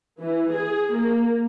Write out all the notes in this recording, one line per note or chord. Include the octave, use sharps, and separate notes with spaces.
E3
G#4
A#3